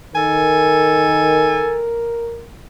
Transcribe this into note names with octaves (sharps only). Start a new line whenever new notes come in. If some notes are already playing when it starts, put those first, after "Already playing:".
D#3 A4 A#4 G#5